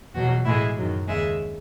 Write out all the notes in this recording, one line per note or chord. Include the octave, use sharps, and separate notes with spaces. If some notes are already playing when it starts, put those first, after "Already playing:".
E2 B2 F#3 F#4
A2 E3 G#3 E4
F#2 D#3 F#3
D#2 C#3 G#3 E5